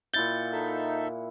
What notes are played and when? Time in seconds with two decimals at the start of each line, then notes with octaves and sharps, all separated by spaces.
0.14 A#2 E4 F#5 G6 A6
0.52 D#4 A4 E5